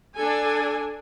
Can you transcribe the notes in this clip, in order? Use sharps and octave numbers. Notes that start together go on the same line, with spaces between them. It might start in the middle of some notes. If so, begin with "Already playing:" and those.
D4 A4 G#5